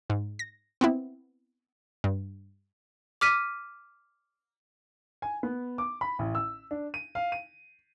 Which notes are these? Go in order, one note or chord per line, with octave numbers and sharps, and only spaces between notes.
G#2
A#6
B3 C4 E4
G2
D6 F6 B6 D#7
G#5
B3
D6
B5
A1
E6
D4
D#7
F5
D#7